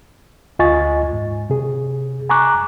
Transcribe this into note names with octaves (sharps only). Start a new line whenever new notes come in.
D2 F4 D#5 G#5 C#6 A6
G#2
C3 G#4
G#5 A#5 C#6 D6 F#6